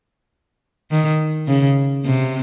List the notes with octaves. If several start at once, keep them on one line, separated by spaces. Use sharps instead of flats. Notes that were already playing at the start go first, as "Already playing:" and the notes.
D#3
C#3
C3